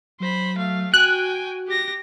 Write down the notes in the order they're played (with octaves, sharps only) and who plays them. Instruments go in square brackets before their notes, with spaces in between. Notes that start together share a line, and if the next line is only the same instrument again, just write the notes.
[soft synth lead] F#3 [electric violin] C5 B5
[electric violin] A3 F5
[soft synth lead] F#4 [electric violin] G5 G#5 [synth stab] F#6
[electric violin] G4 A#6